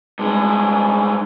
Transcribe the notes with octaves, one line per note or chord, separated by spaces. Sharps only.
G2 G#3